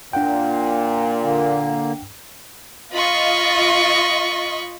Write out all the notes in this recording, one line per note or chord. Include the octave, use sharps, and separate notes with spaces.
A#2 D4 F#5 G5
D3 A#3
F4 D#5 B5 C#6